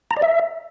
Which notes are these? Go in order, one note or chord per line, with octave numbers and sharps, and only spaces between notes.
A#5
D5
E5